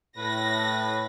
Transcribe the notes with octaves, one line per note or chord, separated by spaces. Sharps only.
A2 B4 A#6